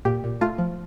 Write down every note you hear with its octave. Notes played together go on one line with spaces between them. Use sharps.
A#2 G4
A#2
A3 F4
F3